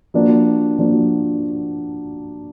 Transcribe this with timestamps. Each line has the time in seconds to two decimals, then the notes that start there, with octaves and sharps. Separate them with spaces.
0.14 F3 A#3 D4 F#4
0.79 F3 A#3 D4 F#4